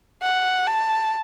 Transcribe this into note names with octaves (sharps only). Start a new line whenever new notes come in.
F#5
A5